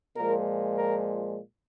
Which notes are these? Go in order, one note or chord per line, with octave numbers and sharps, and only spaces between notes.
A#2 F3 G#3 A#4
A#4